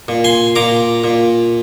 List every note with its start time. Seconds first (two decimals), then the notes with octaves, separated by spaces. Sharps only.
0.08 A#2
0.24 G#5 C6
0.56 A#2 A#5 D6
1.04 A#2